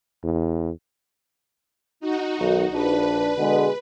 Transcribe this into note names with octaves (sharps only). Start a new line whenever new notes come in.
E2
D#4 F#4
B1 D#3
A#1 D4 B4
B2 D3 G#3